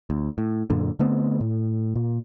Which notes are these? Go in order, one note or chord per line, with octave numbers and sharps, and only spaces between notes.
D2
A2
F#2 A#2 D3
D3 A3 B3 C4
A2
A#2